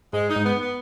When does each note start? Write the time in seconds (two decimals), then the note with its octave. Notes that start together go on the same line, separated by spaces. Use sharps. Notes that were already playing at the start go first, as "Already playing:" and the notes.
0.13 G#2 G#3
0.28 D#4
0.36 G#2
0.44 B3
0.60 B3